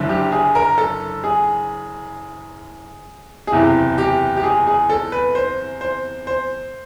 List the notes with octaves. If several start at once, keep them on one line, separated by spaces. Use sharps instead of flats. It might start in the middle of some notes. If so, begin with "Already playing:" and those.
Already playing: F#1 F#2 D3
G4
G#4
A#4
A4
G#4
G#4
F#1 E2 C3 E3 G4
G4
G4
G#4
G#4
A4
B4
C5
C5
C5